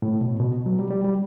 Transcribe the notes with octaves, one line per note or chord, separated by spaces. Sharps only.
A2
B2
B2
F#3
G3
G3
G3